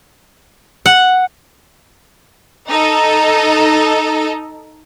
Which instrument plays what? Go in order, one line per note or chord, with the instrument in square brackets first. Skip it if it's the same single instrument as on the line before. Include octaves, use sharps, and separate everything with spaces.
[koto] F#5
[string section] D#4 A4